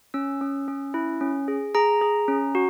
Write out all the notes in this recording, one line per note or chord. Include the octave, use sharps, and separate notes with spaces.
C#4 E6
C#4
C#4
E4
C#4
G#4
G#4 A#5
G#4
C#4
F#4